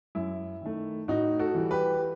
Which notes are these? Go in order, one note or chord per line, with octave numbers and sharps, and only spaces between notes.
F#2 E4
D#3 A3
A2 D#4 F#4
F#4 A4
E3 G3
G4 B4